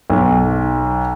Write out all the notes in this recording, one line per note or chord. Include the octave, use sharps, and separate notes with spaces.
B1